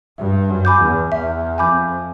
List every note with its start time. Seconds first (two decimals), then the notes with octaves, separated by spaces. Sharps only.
0.18 G2 E5
0.50 F#2
0.65 G#5 B5 D6 G6
0.81 E2
1.12 E2 E5
1.58 F2 G#5 B5 D6 G6